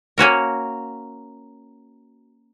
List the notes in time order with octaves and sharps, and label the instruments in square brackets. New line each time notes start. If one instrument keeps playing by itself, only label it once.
[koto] A#3 C#4 F#4 A#4